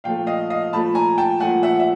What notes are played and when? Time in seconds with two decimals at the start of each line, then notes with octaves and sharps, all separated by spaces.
0.04 A#2 F3 A3 F5 G5
0.27 D#5 F5
0.50 D#5 F5
0.72 A#2 F3 A3 A5 B5
0.95 G#5 A#5
1.18 G5 A5
1.40 A#2 F3 A3 F#5 G#5
1.63 E5 F#5
1.80 E5